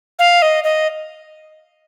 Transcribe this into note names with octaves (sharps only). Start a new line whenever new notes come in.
F5
D#5
D#5